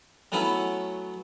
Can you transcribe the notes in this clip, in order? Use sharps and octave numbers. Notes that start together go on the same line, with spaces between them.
F#3 A3 B3 C#4 E4